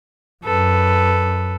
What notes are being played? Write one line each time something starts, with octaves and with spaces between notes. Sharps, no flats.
F#2 A4 B4